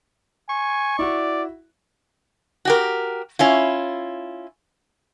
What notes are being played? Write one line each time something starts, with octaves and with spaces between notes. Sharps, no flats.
G#5 C#6
E4 F#4 D5
F#4 G4 A#4
C#4 E4 F4